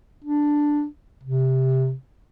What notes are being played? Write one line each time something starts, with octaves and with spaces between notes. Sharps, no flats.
D4
C3